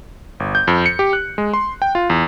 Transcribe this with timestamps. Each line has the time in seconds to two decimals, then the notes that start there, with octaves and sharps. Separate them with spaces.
0.40 G1
0.55 G6
0.67 F2
0.86 C#7
0.99 G4
1.13 F#6
1.38 G#3
1.53 C6
1.82 G5
1.95 F4
2.10 E2